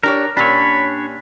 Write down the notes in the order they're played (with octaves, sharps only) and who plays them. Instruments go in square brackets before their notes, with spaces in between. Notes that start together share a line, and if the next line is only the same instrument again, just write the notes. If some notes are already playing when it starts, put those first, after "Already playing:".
[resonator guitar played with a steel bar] D4 G4 C#5 [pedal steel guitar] A#4
[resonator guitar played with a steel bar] A#2 C#4 G4 [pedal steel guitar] D4 C#5 [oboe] B5